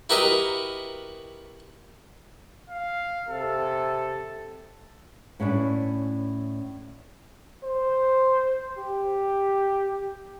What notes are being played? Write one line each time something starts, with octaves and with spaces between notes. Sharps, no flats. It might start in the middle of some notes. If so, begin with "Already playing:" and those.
E4 F#4 G4 A#4 B4 D#5
F5
C3 A4
A2 C#4 D4 E4
C5
G4